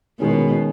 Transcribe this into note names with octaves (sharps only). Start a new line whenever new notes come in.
B2 D#3 G#3 C#4